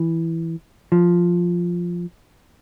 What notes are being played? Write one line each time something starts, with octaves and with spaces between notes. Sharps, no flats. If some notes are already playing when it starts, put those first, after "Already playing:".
Already playing: E3
F3